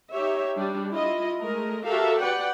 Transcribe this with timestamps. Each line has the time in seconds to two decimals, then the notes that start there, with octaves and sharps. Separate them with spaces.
0.11 D#4 G4 C#5 E5
0.56 G3 D4
0.91 E4 F4 D#5
1.39 G#3 A3 A#4 D#5
1.84 F#4 G4 A4 A#4 E5 F5
2.20 B4 D5 F#5 G5